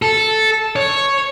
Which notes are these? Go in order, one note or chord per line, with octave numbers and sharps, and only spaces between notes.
A4
C#5